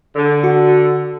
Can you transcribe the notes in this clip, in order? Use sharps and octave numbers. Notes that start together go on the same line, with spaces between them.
D3
F#4